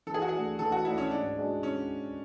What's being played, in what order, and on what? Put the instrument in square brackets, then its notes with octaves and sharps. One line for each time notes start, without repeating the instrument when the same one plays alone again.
[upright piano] E3 [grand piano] A4
[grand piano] G#4
F#4
G#4
[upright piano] A3 D4
[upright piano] E3 [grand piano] A4
[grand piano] F#4
[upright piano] A3 [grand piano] E4
[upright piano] D4
[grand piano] C#4
[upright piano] G#2 [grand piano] D4
[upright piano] G#3 D4 F#4
[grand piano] C#4